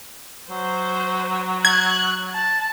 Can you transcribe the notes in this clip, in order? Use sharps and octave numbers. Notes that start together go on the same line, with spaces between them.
F#3 C5
F#6 G#6
A5